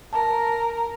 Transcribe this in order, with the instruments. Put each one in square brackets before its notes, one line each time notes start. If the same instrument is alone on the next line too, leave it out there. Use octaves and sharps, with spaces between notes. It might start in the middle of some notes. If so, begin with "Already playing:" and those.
[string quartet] A#4 [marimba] A5